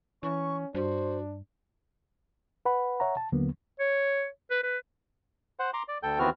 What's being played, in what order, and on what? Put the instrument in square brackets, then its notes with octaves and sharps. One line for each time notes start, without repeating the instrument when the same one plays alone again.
[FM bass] E3 [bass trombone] C#4 [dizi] C#6
[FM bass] G2 [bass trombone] D4 [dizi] F#4 [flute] C5
[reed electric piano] B4 F#5 B5
C#5 E5 F#5 A#5
A5
D#2 D3 F#3 A#3 B3
[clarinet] C#5
B4
B4
[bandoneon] C5 F#5
A#5 C6 D6
D5
D2 A4 G5 G6
D#2 E3 B3 C4 F#4 F6